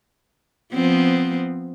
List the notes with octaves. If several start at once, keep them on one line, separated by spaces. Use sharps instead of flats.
F3 B3 C4